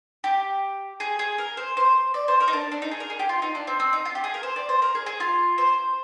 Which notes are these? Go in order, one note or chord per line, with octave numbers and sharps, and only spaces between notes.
G4
G#4
G#4
A#4
C5
C5
D5
C5
A#4
D#4
D4
D4
D#4
G#4
A#4
G#4
G4
F4
D#4
D4
C4
C4
D#4
F4
G4
G#4
A#4
C5
D5
C5
A#4
G#4
G#4
F4
C5